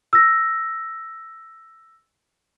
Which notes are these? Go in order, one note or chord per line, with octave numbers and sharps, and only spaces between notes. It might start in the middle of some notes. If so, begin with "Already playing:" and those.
E6 A#6